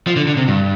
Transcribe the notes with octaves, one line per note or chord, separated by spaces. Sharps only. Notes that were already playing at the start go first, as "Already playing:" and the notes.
F3
D3
D3
C3
G2